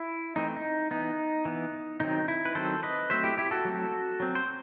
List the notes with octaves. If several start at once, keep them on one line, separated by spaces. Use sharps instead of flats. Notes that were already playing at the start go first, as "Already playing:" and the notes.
Already playing: E4
E3 A3 C4 D#4
D#4
E3 B3 D#4
E3 B3
D#3 F#3 C4 D#4
E4
B4
D#3 F#3 C4 A4 C5
B4 D#5
F#3 A3 C4 C5 E5
E4 G4
E4 G4
F#4 A4
F#3 A3 C4
F#3 C4
C5